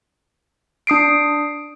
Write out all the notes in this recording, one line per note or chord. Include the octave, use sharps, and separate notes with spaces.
D4 D#6 C7 D7